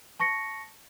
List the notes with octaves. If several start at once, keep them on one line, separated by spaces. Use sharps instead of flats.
A5 C#6 A#6 C#7